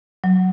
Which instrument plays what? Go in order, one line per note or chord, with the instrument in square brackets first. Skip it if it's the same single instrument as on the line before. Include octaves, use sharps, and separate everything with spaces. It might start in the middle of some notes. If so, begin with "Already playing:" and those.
[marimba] F#3